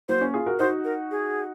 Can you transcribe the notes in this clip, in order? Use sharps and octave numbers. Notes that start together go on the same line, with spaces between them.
F#3 A#3 C5
A#3 C#4
F4 G#4
F#4 A#4
D#4 F#4 C5
A#4
G#4